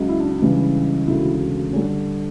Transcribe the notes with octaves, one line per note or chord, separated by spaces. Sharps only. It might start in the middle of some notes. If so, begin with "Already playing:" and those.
Already playing: C#2 C#3 F#3
E4
D4
D4
C#2 C#3 E3 G3
E1 D2 C#3 E4
D3 G3 C#4